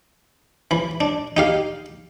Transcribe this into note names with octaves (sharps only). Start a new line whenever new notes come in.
E3 B5
D4
D#4 G4 F5